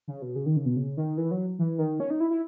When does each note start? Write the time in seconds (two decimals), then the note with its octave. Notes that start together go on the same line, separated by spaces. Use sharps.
0.08 C#3
0.22 B2
0.36 C#3
0.46 D#3
0.57 C#3
0.66 B2
0.76 C#3
0.97 D#3
1.17 E3
1.31 F#3
1.59 E3
1.78 D#3
2.00 C#4
2.10 D#4
2.20 E4
2.30 E4